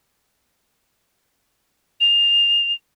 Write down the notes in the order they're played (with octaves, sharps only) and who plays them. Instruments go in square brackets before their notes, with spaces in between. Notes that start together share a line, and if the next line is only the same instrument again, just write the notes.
[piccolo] F7